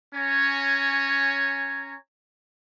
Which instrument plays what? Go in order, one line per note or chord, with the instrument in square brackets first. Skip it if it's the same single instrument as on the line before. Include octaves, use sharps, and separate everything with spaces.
[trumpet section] C#4 C#5 G#5 A#5